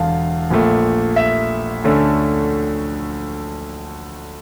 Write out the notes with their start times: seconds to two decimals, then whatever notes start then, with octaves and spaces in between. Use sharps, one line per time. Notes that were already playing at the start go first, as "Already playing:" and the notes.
Already playing: E1 E2 D3 F5 A5
0.51 A#1 A#2 A3
1.16 E5
1.84 D2 D3 A3 C#4